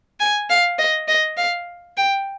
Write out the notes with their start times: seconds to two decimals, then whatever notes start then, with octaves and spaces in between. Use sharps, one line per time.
0.20 G#5
0.50 F5
0.79 D#5
1.08 D#5
1.38 F5
1.97 G5